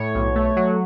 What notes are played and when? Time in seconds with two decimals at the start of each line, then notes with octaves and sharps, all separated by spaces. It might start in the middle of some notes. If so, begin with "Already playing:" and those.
Already playing: A2 C#5
0.15 B1
0.35 A3
0.56 F#3